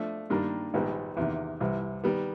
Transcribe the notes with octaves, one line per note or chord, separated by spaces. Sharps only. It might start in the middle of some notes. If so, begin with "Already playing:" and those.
Already playing: F3 A3 D4
G2 D#3 G3 A#3
A#1 G#2 D#3 G3 B3
E2 C3 D#3
C2 C3 E3
D#3 G3 B3